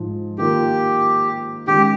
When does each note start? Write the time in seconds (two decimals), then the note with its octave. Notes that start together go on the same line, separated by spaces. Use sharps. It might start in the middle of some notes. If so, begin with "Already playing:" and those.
Already playing: G#2 F3
0.38 D#3 A#3 F4 G4 A#4
1.67 D#3 G#3 C#4 G4